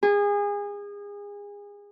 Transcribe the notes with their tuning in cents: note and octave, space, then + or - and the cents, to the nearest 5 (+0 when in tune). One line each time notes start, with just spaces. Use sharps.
G#4 -30